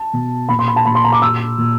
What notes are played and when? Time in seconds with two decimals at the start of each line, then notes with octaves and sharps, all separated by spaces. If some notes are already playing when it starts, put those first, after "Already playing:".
Already playing: A5
0.13 B2
0.49 A#2 B5
0.59 C6
0.68 B5
0.76 A5
0.85 A#2 B5
0.95 C6
1.04 A#5
1.12 D6
1.22 A#2 E6
1.58 A#2